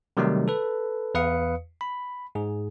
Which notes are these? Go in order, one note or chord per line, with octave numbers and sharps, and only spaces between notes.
C3 D#3 F#3 G3 A3 D#4
A4 B4
E2 B4 F5 D#6 C#7
B5
G#2 G#4